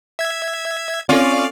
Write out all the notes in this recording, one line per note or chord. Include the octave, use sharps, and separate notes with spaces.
E5 G#6
C4 C#4 F4 A4 D5 F5